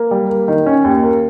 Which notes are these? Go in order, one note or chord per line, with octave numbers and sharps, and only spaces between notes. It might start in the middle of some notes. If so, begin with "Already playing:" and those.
Already playing: A#3
G3
A#3
D#3
C#4
D#2
A#3